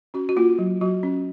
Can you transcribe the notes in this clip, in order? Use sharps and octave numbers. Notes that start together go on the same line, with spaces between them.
C#4 F#4
F#4
A#3 F4
F#3
F#3 F#4
C#4